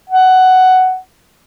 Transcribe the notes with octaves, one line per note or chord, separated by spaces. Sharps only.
F#5